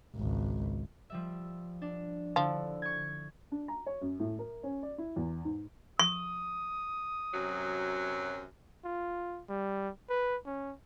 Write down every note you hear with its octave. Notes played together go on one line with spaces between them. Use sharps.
G#1 C#2
F3 G3 E5
D4
D3 F3 E4
C#6 G#6
D4
A#5
C#5
F#2
A2
A#4
C#4
D5
E4
E2
G#2
C#6 D#6
F#2 C3 F#3
F4
G3
B4
C#4